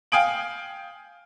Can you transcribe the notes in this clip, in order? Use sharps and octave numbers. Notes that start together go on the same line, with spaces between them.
F5 G5 G#5 D#6 D7 F#7